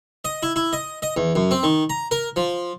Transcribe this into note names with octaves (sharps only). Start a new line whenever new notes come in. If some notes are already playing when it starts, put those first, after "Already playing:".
D#5
E4
E4
D#5
D#5
E2
F#2
C4
D#3
A#5
A#4
F3